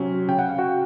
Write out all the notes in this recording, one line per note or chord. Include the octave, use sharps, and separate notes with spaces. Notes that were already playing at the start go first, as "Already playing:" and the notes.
Already playing: C3 F#3 C#4 C5 C#5
C#3 G5
F#5
F5
F#4 F#5